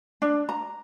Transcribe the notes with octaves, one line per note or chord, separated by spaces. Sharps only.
D4
A#5